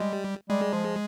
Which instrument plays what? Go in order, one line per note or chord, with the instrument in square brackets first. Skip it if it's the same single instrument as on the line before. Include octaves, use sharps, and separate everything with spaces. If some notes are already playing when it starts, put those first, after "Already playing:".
Already playing: [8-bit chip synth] G3 [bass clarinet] G#3
[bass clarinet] G3 [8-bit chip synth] G#3
[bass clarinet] F3